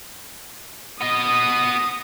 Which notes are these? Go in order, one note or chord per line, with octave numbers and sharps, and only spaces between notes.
B3 D#5 D#6